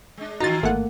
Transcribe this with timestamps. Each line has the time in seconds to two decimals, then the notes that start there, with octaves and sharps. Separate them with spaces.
0.17 G#3 D4
0.40 D#3 E3 D#4 F4 F#4 A#5 A6
0.63 G#1 A3 A#3 F#5